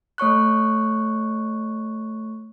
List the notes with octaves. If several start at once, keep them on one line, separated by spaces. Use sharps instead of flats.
A3 C#5 C#6 F#6